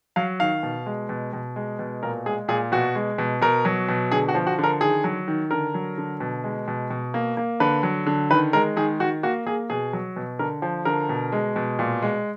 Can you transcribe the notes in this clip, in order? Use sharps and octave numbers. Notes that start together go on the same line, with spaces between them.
F#3 F5
D#3 F5
B2
G#3
B2
B2
G#3
B2
A#2 A#4
G#3 G#4
A#2 G#4
B2 F#4
G#3
B2
B2 A#4
F#3
B2
D3 G#4
F#4
F3
F#4
D3
A#4
D#3 G#4
F#3
D#3
D3 A#4
F#3
D3
B2
G#3
B2
B2
A#3
A#3
D3 B4
F#3
D3
D#3 B4
G#3 A#4
D#3 G#4
D#3 F#4
A#3 F#4
A#3 G#4
B2 G#4
F#3
B2
D3 A#4
F3
D3 A#4
B2
G#3
B2
A#2
G#3